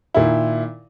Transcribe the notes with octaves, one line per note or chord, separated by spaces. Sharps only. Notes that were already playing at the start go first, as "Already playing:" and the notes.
A#2 D#3 E4